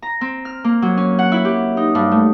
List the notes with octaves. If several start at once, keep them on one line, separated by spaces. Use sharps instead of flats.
A#5
C4
F6
A#3
F#3
C#4
F#5
E4
G4
D#4
G2
A3